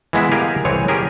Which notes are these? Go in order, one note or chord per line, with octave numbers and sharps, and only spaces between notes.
E3 G#3 B3 E4
G4 G#4 A#4 F5 G#5
C2 E3 C4 G#4 C#5
C#4 G4 G#4 A#4